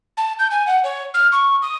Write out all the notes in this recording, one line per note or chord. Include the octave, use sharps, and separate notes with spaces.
A5
G6
G#5
F#5
C#5
F6
C#6
D#6